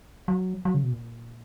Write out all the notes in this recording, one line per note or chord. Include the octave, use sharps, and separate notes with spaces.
F#3
F#3
C#3
B2
A#2